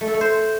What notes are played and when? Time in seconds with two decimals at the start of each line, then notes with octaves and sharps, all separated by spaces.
0.01 A3
0.08 A4
0.14 A3
0.21 C5